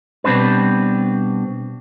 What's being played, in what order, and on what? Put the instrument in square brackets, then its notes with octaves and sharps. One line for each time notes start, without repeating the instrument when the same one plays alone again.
[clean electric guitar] B2 G3 C4 D4 B4